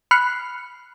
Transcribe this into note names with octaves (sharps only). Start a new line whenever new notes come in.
B5 F6 F#6 C7 C#7